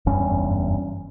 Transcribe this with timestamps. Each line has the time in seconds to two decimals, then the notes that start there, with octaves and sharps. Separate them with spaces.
0.06 F#1 E2 G2 C#4